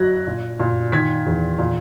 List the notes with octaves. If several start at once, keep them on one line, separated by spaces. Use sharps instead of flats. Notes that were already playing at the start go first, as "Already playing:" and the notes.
Already playing: F#3 F#6 G#6 A#6
A#2
A#2
D#3 G#6 B6
E2
A#2